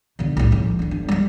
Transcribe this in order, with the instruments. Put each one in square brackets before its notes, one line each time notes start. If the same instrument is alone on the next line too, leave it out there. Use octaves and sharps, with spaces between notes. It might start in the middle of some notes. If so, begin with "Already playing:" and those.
[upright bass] B2 D3
C2 A2
C#2 F3
E3 D4
G1
G3 G#3